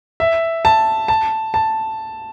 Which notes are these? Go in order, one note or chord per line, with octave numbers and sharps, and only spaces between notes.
E5
A5
A5
A5